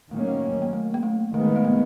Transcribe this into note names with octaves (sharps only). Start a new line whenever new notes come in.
D#3 F#3 A3 A#3 C#4
A#3
A3
A#3
A3
D#3 G#3 A3 B3
A3
A#3